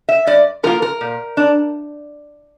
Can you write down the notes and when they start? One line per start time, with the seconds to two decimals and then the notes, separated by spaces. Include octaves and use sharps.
0.09 E5
0.27 G2 D5
0.63 F3 A#3 F4 A#4
0.82 A#4
1.01 A#2
1.37 D4